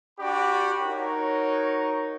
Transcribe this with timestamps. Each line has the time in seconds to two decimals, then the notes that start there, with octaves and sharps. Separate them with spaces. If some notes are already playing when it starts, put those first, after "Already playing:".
0.19 D4 F#4 G4 D5 B5 D6
0.81 D#4 F#4 A#4 C#5